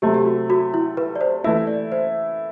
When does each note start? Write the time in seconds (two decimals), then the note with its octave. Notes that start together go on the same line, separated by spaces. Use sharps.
0.02 C3 F#3 A3 G4
0.14 G4
0.26 F#4
0.50 F#4
0.74 E4
0.97 B4
1.16 D5
1.21 C5
1.44 E3 A3 E4 E5
1.67 D5
1.92 C5